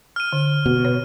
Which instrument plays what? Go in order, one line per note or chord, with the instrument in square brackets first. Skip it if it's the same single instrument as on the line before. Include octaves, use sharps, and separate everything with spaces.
[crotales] F6 D#7
[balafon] D3
[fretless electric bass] B2
[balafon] B4 C#5